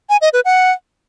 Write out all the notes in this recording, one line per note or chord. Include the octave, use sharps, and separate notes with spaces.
G#5
D#5
B4
F#5